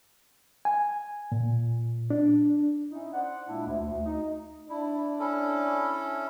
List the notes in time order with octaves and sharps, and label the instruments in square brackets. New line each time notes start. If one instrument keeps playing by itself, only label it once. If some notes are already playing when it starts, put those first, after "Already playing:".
[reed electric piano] G#5
A#2
D4
[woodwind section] C#4 D#4 E4
C5 D5 F#5
A#2 G#3 A#3 D4 E4
D2
D2
D#4
[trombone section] D4 [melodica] E4
[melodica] C#4 E4 A4